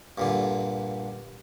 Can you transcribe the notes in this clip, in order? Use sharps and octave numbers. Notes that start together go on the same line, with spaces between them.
G2 A#2 D3